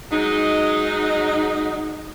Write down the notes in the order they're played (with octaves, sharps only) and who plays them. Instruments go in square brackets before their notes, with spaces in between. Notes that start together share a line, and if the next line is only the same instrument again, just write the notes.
[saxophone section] F#3 G#3 D#4